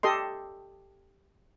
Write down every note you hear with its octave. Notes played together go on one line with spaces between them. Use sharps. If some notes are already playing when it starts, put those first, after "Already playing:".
G4 A4 D#5 C6